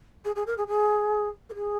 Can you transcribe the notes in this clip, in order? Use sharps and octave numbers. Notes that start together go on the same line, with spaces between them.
G#4
G#4
A#4
G#4
G#4
A#4
G#4